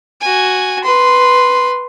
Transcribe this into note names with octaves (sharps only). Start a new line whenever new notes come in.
F#4 G#5
B4 C6